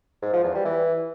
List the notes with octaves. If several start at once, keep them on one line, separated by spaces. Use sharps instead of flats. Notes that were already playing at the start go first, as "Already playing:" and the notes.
G#2
F3
E2
G3
E3